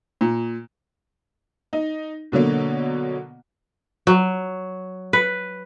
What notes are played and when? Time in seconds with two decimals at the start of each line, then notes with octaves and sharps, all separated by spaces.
0.21 A#2
1.73 D#4
2.32 B2 D3 F#3 A#3
4.07 F#3
5.13 B4